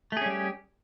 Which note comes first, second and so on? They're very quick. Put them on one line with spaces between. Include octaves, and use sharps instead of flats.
A3 G#4 C#4 G3 G4